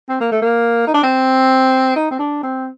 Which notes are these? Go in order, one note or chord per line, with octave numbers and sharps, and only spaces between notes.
C4
A#3
A3
A#3
D#4
D4
C4
D#4
C4
D4
C4